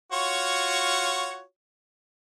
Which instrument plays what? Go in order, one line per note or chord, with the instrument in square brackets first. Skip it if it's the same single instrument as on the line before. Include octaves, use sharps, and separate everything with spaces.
[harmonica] F4 F#4 C#5